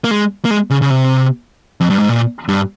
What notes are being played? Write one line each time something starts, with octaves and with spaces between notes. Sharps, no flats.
A#3
G#3
A#3
G#3
C#3
C#3
C3
F2
G2
G#2
A#2
G2